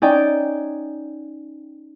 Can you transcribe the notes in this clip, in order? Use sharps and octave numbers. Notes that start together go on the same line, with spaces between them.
C#4 D#4 D5 G5